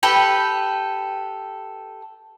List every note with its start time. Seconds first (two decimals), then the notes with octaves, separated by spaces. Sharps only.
0.03 G4 A4 B4 G5